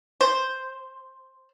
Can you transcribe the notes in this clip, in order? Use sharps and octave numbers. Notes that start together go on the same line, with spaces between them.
C5